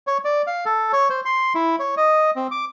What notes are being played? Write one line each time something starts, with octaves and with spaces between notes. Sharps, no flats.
C#5
D5
F5
A4
C#5
C5
C6
E4
C#5
D#5
C4
D6